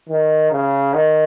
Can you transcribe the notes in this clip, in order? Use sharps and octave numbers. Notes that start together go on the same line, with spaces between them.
D#3
C#3
D#3